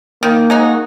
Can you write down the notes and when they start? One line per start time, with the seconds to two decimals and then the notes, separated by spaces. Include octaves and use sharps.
0.23 D#3 A#3
0.50 G#3 D#4 F#4